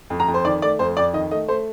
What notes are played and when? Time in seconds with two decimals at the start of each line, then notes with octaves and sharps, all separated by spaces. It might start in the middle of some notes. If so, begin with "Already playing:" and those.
0.10 F2
0.20 A#5
0.28 F2
0.34 C5
0.45 D#3 D5
0.62 A3 D5
0.79 F2 C5
0.97 F2 D5
1.13 D#3 D#5
1.31 A3 D#5
1.48 A3 C5